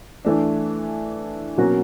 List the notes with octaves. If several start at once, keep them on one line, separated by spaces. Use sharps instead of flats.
E3 A3 D4
B2 F#3 A#3 C#4 F#4